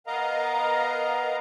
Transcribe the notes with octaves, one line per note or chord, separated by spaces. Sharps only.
B3 A#4 D#5 F5 A#5